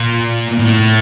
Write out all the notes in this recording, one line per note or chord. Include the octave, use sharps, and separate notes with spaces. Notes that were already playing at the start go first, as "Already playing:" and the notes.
Already playing: A#2
A2